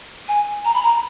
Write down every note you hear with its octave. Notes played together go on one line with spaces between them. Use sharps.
G#5
A#5
B5
A#5